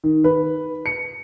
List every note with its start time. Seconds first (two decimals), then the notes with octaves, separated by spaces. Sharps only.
0.04 D#3
0.24 B4
0.86 C#7